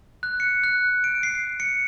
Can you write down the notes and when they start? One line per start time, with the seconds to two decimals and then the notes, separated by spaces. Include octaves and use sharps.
0.23 F#6
0.40 C#7
0.64 F#6
1.04 D7
1.23 C7
1.60 C#7